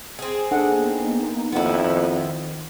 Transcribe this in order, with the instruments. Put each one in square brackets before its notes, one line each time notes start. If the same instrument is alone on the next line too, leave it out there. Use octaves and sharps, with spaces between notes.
[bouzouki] C4 G#4
[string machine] A#3 B3 D#4 [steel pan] D4 A4 F#5
[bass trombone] F2 [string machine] D#3 [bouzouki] B3 E4